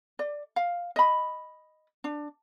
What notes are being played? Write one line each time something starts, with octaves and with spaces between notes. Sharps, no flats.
D5
F5
D#5 B5
D4